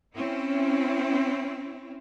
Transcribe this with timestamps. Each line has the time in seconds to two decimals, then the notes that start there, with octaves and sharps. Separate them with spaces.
0.17 C4 C#4 E4